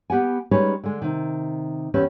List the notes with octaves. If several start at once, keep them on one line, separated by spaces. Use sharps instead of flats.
B3 G4 F#5 G#5
G3 G#3 C#4 D#4 B4 C#5
D3 G#3
C3 D#3
E2 C#4 G4 B4 E5